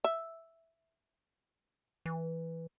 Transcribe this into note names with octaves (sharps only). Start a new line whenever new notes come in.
E5
E3